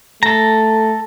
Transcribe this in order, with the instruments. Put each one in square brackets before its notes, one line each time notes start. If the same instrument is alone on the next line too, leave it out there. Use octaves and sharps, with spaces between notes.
[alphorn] A3 [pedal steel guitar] A4 A#5